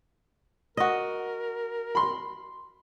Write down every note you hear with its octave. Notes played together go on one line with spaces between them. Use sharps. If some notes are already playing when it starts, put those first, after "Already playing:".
F#4 A#4 D#5
B5 C6